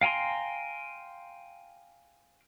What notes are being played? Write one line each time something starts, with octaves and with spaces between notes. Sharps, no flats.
F5 G5 G#5 A#5 C6